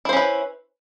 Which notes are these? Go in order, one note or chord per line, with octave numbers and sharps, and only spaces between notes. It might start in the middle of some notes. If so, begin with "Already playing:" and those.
C#4 E4 B4 C5